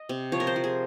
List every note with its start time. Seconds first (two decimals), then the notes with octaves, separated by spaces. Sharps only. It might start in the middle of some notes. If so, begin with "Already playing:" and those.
Already playing: D#5
0.09 C3
0.32 F3 C#5
0.40 A#4
0.47 C5
0.56 F3
0.64 G#4